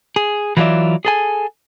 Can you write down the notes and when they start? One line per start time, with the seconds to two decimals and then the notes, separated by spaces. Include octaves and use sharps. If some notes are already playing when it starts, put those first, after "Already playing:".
0.16 G#4
0.57 E3 F#3 F4 G#4 D5 E5
1.05 G#4 A4 G#5